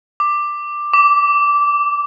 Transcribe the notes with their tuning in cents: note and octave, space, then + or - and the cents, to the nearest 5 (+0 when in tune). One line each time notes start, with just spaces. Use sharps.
D6 +10
D6 -15